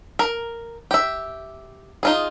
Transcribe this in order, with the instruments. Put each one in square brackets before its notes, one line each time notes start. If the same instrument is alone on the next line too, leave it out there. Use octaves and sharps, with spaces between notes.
[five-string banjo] A#4
G4 E5
D#4 F4 G#4